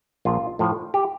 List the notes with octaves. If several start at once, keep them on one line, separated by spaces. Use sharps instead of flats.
A#1 F4
A2 F3
G4